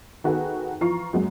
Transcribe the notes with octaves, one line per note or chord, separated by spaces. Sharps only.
D#3 F#4 G#4 A4 B4
E3 F3 F4 A#5 C#6 C7
F#2 F#3 G#3 A#3 F#4